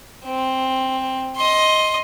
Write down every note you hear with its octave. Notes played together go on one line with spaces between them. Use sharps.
C4
D#5 C6